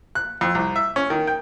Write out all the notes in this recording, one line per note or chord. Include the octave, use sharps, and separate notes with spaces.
F#6
F2
C2
E5
C#4
D#3
G5